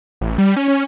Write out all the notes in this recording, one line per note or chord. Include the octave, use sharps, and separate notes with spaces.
A1
G3
C#4
C#4